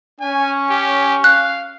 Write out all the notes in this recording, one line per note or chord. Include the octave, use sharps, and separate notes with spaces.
C#4 G#5
G4
F5 F#6